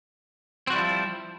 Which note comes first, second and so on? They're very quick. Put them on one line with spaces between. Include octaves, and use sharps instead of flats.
C4 F#4 G3 E4 F3